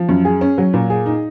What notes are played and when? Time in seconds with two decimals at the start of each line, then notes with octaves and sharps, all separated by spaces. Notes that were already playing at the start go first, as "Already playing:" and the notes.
Already playing: F3
0.09 F#2
0.25 G#4
0.41 C#4
0.58 F#3
0.74 A#2
0.90 G#4
1.06 D#4